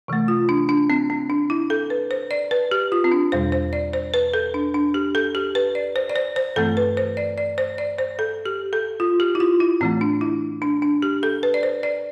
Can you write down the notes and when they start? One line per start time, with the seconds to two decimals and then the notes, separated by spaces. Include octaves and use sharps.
0.08 C3 E3 A3
0.28 F4
0.49 D4
0.69 D4
0.90 C4
1.10 C4
1.30 D4
1.50 E4
1.70 A4
1.90 B4
2.11 C5
2.31 D5
2.51 B4
2.71 G4
2.92 F4
3.04 C4
3.12 D4
3.32 E2 B2 G3 C5
3.52 C5
3.73 D5
3.93 C5
4.14 B4
4.33 A4
4.54 D4
4.74 D4
4.94 G4
5.15 A4
5.35 G4
5.55 B4
5.75 D5
5.96 C5
6.10 D5
6.16 C5
6.36 C5
6.56 G2 E3 A3 C4 A4
6.77 B4
6.97 C5
7.17 D5
7.38 D5
7.58 C5
7.78 D5
7.98 C5
8.19 A4
8.46 G4
8.73 A4
9.00 F4
9.20 G4
9.35 E4
9.40 F4
9.60 E4
9.81 A2 E3 A3 C4
10.01 D4
10.21 E4
10.62 D4
10.82 D4
11.02 G4
11.23 A4
11.43 B4
11.54 D5
11.63 C5
11.83 D5